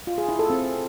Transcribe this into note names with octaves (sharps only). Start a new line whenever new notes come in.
F4
G#4
E4
A4
C4